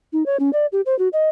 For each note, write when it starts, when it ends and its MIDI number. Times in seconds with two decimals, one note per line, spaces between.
0.13 0.26 63
0.26 0.37 73
0.40 0.50 61
0.53 0.66 74
0.72 0.81 67
0.86 0.97 72
0.99 1.08 66
1.13 1.30 75